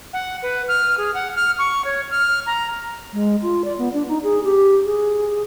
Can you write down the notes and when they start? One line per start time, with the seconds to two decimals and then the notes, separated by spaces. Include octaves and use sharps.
0.13 F#5
0.43 B4
0.68 F6
0.98 G#4
1.14 F#5
1.36 F6
1.59 C#6
1.85 C#5
2.11 F6
2.46 A#5
3.13 G#3
3.42 F4
3.64 D5
3.79 B3
3.93 D4
4.09 D#4
4.23 G#4
4.44 G4
4.85 G#4